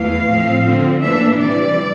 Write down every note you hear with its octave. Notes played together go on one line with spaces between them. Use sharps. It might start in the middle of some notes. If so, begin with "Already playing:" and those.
Already playing: E2 E3 A3 F5
A2 F3 C4
D3 F3 C4
A2 E3 A#3 D4 E5
C3 E3 G3 D5